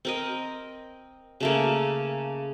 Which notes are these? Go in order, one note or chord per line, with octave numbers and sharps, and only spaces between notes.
C4 A#4 D#5
C#3 A3 A#3